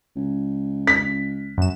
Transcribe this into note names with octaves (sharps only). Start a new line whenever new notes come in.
C#2
B6
F#2 E7